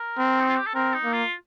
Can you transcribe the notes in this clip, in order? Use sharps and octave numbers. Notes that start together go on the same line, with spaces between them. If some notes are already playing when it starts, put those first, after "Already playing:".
Already playing: A#4
C4
D#4
F4
G4
A4
C4 A#4
D#4
A#3
F4